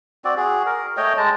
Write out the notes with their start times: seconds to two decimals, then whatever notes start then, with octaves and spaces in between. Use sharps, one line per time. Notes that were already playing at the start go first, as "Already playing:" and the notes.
0.24 C4 F#4 D5
0.37 F#4 G#4
0.66 A#4
0.97 A3 C#5 D#5 G5
1.17 G#3 A5 A#5